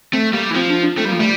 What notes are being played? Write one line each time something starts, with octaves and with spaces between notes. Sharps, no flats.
A3 C4
G3 A#3
E3
F3 C4
D4
D4
A3 C4
G3
A#3
F3
G3 A3